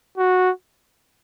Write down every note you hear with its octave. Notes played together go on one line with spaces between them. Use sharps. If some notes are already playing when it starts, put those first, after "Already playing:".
F#4